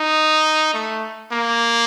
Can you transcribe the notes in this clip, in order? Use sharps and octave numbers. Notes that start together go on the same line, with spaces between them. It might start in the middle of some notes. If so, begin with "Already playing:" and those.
Already playing: D#4
A3
A#3